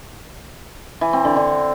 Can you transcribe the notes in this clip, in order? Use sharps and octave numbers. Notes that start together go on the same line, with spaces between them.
E3
C4
D3
D3